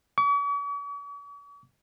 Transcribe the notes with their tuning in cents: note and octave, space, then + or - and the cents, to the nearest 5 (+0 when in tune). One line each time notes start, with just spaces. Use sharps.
C#6 +45